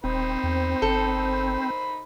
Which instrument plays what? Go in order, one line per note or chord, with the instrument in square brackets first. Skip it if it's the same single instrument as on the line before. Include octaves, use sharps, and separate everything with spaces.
[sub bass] D#1 [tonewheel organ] C4 [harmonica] D#4 C5 B5
[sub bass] E2
[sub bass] G1 [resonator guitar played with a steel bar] A4